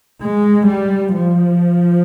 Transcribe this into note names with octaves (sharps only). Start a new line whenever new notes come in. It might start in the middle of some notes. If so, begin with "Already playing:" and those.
G#3
G3
F3